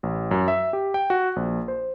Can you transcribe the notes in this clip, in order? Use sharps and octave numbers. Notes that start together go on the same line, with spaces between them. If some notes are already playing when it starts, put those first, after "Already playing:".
A1
F#2
E5
G4
G5
F#4
A#1
C5